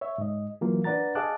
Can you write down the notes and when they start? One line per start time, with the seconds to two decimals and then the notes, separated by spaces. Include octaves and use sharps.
0.01 C#5 E5
0.18 G#2 D#5
0.61 E3 F#3 A#3 F4
0.84 D4 B4 D5 F#5 A#5 A6
1.15 G#4 D#5 F5 A5 D6 F#6